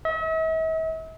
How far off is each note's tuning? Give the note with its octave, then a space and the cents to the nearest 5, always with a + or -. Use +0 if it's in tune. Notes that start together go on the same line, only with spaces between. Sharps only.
E5 -45